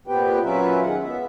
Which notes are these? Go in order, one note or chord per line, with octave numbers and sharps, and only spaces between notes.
A#2 B3 C4 G4 B4 G5
F#3 C#4 F4 A#4 B4 E5
D#3 G#3 F#5
B3 E5